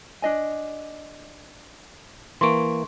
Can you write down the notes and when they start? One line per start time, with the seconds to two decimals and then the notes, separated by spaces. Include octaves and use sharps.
0.22 D4 D#5 G#5
2.41 E3 A#3 C6 C#6 D7